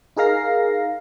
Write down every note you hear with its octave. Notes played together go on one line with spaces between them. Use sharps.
D#4 G#4 A#4 F5 A#6 C7